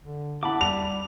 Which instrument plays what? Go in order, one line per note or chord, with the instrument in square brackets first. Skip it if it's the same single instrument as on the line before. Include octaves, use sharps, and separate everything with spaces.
[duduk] D3
[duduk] E4 [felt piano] F#5 A5 [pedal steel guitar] B5 D6
[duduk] G3 [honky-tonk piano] F7